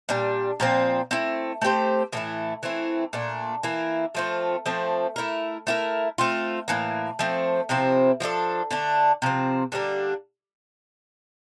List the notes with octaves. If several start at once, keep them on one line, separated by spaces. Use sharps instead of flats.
A#2 G3 D4
A#2 F3 C4
A3 C4 E4
A3 C4 G4 C5
A2 E3 A3 E4
E3 A3 C4 E4
A#2 A3 D4
E3 A#3 E4
F3 A3 C4 F4
F3 A3 C4
A3 E4 A#4
A3 E4 G4 A#4
A3 C4 F4
A2 E3 A#3
F3 A3 C4
C3 F3 C4 E4
F3 A#3 D4 A4
D3 A3 D4
C3 F3 C4
D3 G3 A#3 D4